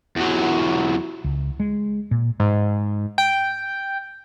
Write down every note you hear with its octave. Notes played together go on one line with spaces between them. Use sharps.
E2 F#3
C#2
G#3
A#2
G#2
G5